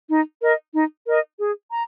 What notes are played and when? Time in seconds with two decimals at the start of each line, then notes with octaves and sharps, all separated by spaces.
0.08 D#4
0.40 A#4 D#5
0.73 D#4
1.06 A#4 D#5
1.38 G#4
1.71 A#5